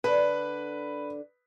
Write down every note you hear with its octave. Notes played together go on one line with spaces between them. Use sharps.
D3 D4 B4 B5